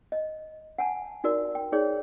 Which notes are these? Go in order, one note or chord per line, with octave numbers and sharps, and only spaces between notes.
D#5
F#5 G#5 A5
D#4 F#4 A#4 D5
G5
D#4 G#4 C#5 D5